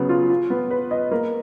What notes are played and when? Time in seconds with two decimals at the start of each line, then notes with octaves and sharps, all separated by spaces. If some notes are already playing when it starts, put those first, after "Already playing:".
Already playing: C#3 F#3 B3
0.09 F4
0.30 F4
0.50 B3
0.70 B4
0.91 D#5
1.11 A#3